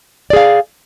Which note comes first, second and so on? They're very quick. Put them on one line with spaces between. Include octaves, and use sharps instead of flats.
D5 G#4 F5